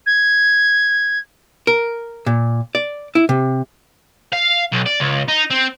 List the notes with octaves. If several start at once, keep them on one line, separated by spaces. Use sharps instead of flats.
G#6
A#4
A#2
D5
E4
C3
F5
B1
D5
C#2
D#4
C4